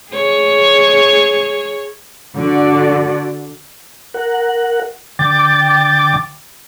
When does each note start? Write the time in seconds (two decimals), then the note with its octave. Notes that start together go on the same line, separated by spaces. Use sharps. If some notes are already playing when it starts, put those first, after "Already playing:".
0.12 G#4 C#5
2.34 D3 F#4 D5
4.14 A#4 F#5
5.19 D3 G5 D6 A6